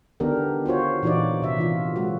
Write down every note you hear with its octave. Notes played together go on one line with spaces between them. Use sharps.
D3 D#3 B3 D4 G4 A#4
F4 F#4 C5 C#5
A#2 E3 D#4 F#4 C#5 D5
C3 E5
D#3 E3 F4
F#3 G#3 F#4